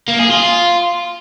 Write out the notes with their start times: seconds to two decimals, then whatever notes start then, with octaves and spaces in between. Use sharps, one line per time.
0.08 A#3
0.19 G#4
0.30 F4